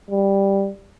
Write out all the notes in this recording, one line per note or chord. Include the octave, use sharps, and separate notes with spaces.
G3